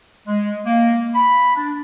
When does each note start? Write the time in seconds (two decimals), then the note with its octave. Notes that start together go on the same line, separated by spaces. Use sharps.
0.27 G#3
0.66 A#3
1.15 B5
1.55 D4